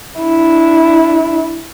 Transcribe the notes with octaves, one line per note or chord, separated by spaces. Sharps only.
D4 E4